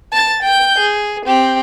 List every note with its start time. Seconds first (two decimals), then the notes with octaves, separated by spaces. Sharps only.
0.12 A5 A6
0.43 G5 G6
0.79 G#4
1.26 C4 G4